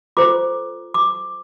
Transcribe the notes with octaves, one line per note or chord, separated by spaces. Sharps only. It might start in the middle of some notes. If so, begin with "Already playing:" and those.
F4 A4 C5 D6
D6